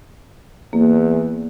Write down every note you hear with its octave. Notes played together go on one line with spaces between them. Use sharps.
E2 A#3